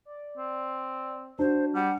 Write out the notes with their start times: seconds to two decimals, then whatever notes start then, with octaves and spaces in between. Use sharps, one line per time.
0.05 D5
0.38 C4
1.39 D4 F#4 C5
1.75 G3 F#5